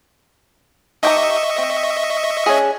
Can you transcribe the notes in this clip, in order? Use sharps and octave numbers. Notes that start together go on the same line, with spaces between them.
D#4 G4 D#5 E5 A#5 C#6
C4
C#4 D4 G#4